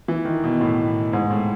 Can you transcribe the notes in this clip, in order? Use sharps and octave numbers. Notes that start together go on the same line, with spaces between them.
E3
D#3
B2
A2
G#2
A2